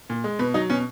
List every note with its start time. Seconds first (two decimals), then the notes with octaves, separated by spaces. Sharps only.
0.10 A#2
0.24 G#3
0.39 B2 B4
0.54 F#3 D#4
0.69 B2 C#4